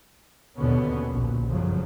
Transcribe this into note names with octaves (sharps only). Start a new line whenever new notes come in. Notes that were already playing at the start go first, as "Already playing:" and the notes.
D#2 B2 D3 B3 C#4
A#1
G1 F#2 C#3 F3 F#3